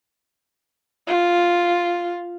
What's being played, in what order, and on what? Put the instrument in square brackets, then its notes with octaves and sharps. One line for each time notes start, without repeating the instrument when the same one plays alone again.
[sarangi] F4